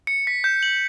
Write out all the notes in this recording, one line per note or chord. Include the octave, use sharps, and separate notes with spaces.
C#7
B6
G6
F#7